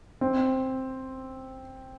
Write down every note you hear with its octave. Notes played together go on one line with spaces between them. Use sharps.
C4